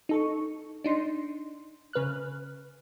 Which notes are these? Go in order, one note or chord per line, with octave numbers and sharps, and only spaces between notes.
D#4 A4 C#6
D4 D#4 C6
C#3 B4 F6 F#6